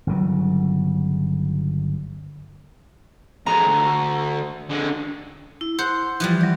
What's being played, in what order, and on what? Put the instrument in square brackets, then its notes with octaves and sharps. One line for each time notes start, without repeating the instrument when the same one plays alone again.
[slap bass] G1 C#3 F#3
[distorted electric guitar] F2 G#3 [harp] A#5
[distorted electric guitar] D2
D3 G#3
[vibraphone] E4
[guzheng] C5 F#5
E3 F3 G3
[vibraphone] F#3 D5